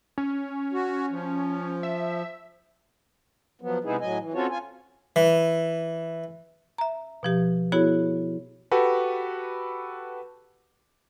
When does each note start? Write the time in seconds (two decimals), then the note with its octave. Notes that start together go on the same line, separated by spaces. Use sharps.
0.18 C#4
0.73 F#4
1.11 F3
1.83 E5
3.62 F3 F#3 B3
3.84 C3 G#3 B3 D#4 E4 G#4
4.01 A2 F#3 D#5 G#5
4.20 E3
4.34 C4 C#4 F4 F#4 A4 C#5
4.50 F4 G#5
5.16 E3
6.78 E5 A#5
7.23 B2 F3 G4
7.72 B3 E4 F#4 G#4 C#5
8.71 F#4 G4 A4 B4